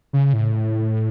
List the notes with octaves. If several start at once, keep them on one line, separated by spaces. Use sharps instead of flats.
C#3
A2